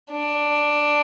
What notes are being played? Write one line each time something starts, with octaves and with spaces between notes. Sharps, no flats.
D4